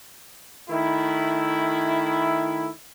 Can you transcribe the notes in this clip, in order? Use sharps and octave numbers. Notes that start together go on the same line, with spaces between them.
D#3 A3 E4